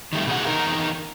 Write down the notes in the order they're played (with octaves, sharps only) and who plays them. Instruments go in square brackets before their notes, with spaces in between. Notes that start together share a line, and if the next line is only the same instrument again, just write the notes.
[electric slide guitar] D#3 G3 A3
B2 G#4 F#5
E2 C3 D#4 A#4